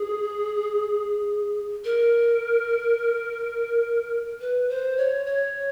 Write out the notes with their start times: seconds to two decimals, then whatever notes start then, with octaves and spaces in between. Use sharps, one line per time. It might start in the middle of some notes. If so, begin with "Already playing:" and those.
Already playing: G#4
1.84 A#4
4.41 B4
4.69 C5
4.98 C#5
5.26 C#5